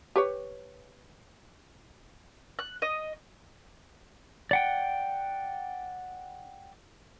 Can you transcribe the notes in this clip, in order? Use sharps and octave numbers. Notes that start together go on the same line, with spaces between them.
G4 B4 C#5
F#6
D#5
D5 F#5 G5